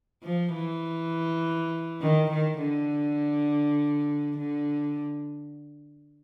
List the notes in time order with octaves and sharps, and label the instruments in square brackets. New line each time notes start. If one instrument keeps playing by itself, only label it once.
[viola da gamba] F3
E3
D#3
D#3
D3
D3